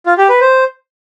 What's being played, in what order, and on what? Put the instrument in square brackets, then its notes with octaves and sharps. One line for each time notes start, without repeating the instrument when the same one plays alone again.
[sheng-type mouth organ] F4
G4
B4
C5